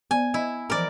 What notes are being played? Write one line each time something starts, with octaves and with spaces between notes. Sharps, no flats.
B3 D5 G#5
E4 D#5
E3 F3 A#4 D5